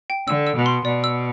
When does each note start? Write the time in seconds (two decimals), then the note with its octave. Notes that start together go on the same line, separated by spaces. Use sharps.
0.10 G5
0.27 D3 E6
0.47 E6
0.56 B2
0.66 C6
0.84 B2 D5
1.04 E6